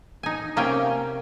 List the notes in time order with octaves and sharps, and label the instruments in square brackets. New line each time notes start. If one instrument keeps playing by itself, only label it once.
[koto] D#4 G#5
C3 A#3 C#4 F5 G5 G#5